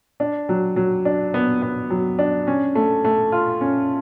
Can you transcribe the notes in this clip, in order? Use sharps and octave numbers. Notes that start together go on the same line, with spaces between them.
D4
F#3
F#3
D4
B3
B3
F#3
D4
C#4
A3
A3
F4
C#4